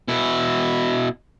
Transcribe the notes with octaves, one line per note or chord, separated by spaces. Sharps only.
B2 E4